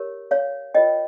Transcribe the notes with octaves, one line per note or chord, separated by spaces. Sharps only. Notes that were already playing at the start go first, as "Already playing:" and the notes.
Already playing: G4 A#4 C#5
C#5 F5
F4 A#4 C#5 D#5 G5